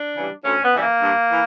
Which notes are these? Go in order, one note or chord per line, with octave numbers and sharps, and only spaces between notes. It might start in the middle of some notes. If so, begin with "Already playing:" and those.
Already playing: D4
C#3 E3 G3
D2 C#4
B3
C#3 E3 G3
A#3
G2
E3